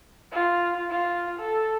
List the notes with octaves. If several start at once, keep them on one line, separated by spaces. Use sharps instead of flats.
F4
F4
A4